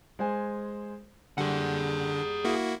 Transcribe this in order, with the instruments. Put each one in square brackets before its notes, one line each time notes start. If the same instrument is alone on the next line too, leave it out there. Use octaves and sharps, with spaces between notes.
[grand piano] G#3 C5 G#5
[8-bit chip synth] D3 [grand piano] G3 [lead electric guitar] G#4 F#5
[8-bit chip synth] A#3 E4 F#4